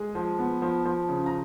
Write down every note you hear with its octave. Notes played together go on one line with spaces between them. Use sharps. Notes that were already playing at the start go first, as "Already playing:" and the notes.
Already playing: G#3 G#4 G#5
F3
B3
F3
F3
C#3
A#5